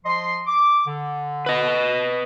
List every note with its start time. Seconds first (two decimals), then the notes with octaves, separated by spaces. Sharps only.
0.05 F3 D#5 C6
0.47 D6
0.87 D3
1.46 B4 D#5